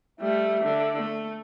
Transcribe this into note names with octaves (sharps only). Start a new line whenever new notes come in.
G3 A3 E5
D3
A3